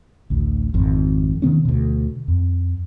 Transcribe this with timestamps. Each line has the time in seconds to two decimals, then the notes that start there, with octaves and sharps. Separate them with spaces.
0.30 A1 D2
0.74 G#1 F2
1.42 C3 D#3 B3 C#4
1.65 D2 B2
2.28 F2